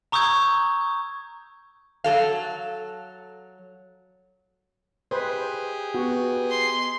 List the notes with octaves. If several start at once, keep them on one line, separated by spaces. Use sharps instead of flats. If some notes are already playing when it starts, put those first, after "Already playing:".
A#5 C#6 D#6 E6 G6 G#6
F#3 A4 F5
G4 G#4 B4 C5 D#5
B3 F#4
C6